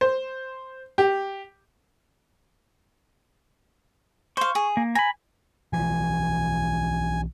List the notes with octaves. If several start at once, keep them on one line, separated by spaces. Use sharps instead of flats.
C5
G4
C5 F5 C#6
G#4
A#3
G#5 A#5 B5
B1 E3 F3 G#5